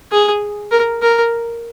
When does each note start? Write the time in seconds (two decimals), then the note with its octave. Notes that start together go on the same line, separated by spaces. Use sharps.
0.11 G#4
0.71 A#4
1.02 A#4